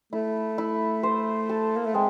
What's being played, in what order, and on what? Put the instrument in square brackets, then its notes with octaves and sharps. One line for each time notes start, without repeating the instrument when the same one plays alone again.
[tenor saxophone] A3 [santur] E4
[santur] E4
C5
A4
[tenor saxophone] A#3
A3
[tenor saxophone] G#3 [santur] C4